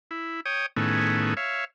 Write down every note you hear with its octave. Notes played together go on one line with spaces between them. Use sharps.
E4
C#5 G5 D#6
A2 D#3 A3 B3 C#4 G#4
C#5 E5 F5